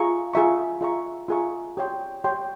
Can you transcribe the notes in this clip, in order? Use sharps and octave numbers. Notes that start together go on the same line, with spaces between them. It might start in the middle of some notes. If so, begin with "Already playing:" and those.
Already playing: F4 G#4 E5 A#5 C#6
F4 G#4 E5 A#5 C#6
F4 G#4 E5 A#5 C#6
F4 G#4 E5 A#5 C#6
G4 C#5 G5 C6
G4 C#5 G5 C6